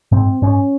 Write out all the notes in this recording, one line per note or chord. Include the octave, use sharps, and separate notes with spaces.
G#2 C4
G#2 C#4